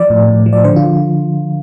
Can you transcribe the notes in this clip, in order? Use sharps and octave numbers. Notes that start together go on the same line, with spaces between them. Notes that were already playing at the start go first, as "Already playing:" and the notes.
Already playing: F3 D5
A2
A2
F3
D5
D3 C5
F4